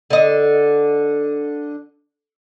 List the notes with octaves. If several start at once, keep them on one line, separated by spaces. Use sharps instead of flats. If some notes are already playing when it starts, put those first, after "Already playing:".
D3 D#5